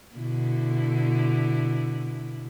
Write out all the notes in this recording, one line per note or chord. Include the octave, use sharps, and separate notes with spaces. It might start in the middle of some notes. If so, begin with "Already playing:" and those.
B2 D3 E4